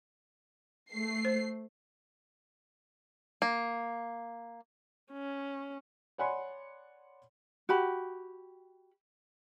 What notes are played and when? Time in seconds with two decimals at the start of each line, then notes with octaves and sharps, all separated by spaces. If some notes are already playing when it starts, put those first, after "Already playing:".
0.92 A3 C7
1.25 C5
3.42 A#3
5.12 C#4
6.18 C#5 D5 F#5 G#5 B5 C6
7.69 F#4 G4 B5